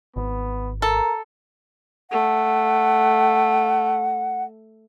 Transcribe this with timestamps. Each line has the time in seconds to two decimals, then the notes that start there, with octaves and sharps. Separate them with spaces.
0.16 G#1 B3
0.82 A4 A#4 A#5
2.11 A3 F#5